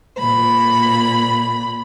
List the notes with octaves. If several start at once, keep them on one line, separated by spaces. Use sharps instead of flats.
A#2 B5